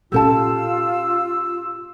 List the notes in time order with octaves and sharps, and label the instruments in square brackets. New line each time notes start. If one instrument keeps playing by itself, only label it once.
[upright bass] A#2 C#4 [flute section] F4 [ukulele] G4 A4 A5 [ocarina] E6